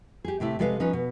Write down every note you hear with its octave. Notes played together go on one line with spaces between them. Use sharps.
G4 G#4
A2 C3 A3 E4
C3 G#3 G#4 A4 B4 F5
F3 C#4 D#4 B4
B2